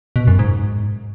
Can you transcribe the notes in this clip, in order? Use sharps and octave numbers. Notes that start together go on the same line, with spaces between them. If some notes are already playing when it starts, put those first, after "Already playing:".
B2
F#2
G#2